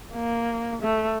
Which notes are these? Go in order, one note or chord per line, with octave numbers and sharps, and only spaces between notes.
A#3
A3